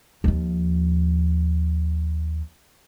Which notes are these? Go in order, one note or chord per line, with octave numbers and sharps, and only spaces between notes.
D#2 F3